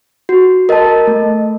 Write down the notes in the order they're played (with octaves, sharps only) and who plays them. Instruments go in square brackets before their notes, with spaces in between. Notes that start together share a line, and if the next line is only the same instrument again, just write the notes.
[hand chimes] F#4
A#4 D#5 A5
A3